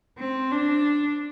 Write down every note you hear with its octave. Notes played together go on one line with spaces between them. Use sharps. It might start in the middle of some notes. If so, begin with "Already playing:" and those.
C4
D4